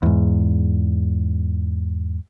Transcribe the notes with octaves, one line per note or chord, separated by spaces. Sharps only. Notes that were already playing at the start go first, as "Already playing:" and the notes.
E2 G#2